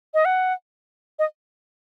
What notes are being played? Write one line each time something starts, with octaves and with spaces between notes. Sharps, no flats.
D#5
F#5
D#5